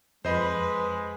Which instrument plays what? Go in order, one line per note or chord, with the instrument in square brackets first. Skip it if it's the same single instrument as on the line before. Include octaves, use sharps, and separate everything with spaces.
[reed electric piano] F2 [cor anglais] G#3 [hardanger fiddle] B4 [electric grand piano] C5 D#5 B5